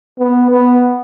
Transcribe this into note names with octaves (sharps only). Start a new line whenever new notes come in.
B3
B3